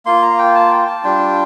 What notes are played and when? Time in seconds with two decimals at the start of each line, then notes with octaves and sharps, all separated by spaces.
0.06 A#3 F4 C6
0.22 A#5
0.39 G5
0.55 A5
0.71 G5
0.87 A5
1.04 G3 D4 F4 G5